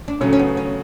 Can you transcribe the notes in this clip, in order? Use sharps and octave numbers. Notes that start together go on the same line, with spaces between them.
D4
C#3 F#3 A3 C#4
C#4
B3
C#4